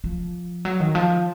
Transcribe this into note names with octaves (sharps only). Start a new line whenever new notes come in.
F3
F#3
D#3
F3